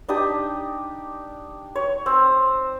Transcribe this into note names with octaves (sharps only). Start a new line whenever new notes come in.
D4 D#4 G4 D#6
C#5
C4